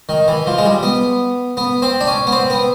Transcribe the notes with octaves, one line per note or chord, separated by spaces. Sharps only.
D#3
E3
F3
G#3
G3
B3
B3
C4
D4
C#4
B3
C4
B3